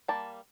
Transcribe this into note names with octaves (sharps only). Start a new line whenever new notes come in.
G3 A#3 A5